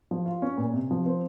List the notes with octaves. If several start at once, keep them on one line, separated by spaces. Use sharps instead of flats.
F3
F4
C#4
A#2
C3
F3
C4